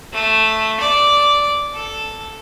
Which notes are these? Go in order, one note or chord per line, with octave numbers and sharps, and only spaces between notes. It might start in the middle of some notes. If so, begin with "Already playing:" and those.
A3
D5
A4